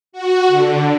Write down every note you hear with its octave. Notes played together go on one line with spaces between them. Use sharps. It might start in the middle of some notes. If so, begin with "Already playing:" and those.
F#4
D3